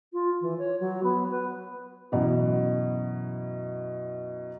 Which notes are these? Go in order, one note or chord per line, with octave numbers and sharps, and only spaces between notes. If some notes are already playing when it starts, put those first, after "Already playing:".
F4
E3
C#5
F#3
B3
B4
F#2 B2 E3